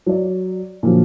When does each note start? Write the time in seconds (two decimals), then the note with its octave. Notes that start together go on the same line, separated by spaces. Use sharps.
0.06 F#3 D5
0.83 A#2 D3 F3 F#3